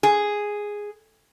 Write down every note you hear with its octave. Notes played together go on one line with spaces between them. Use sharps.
G#4